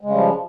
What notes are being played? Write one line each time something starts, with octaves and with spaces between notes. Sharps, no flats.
C#3 F3 G3 G#3